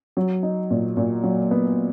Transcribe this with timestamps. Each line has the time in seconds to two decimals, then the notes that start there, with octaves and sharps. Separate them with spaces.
0.17 F#3
0.43 D#4
0.71 A#2
0.97 A#2
1.23 F#3
1.51 B3